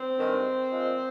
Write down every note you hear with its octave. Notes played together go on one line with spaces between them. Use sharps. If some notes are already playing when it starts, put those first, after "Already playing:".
Already playing: C4
G2 D#3 G#3
A#2 F3 G#3